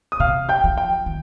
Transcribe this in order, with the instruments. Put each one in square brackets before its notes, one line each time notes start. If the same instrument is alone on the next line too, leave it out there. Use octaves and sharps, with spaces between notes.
[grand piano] D#6
[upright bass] C3 [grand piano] F5 F6
[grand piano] G5 G6
[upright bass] F3
[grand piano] G5
[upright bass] D#3